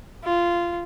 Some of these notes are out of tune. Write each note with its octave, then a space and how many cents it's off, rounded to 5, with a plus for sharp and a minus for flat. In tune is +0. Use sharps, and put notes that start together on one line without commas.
F4 -15